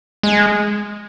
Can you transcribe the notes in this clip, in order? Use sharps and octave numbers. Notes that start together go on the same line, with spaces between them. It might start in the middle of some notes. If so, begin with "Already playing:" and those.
G#3